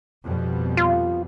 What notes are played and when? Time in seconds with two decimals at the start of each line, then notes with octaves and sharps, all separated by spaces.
0.23 F2 B2 G3
0.77 F4